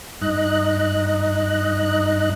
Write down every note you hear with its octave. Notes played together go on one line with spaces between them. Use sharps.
G2 D#4 D#5 F#6